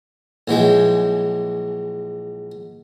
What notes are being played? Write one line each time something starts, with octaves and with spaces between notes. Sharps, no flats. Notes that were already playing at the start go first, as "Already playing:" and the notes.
A#1 E3 F#3 G#3 G5